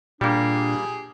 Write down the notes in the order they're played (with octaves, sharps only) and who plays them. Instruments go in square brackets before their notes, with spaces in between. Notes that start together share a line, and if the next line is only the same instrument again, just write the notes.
[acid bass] A#2 [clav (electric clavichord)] G3 A#3 [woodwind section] D4 [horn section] G4 G#4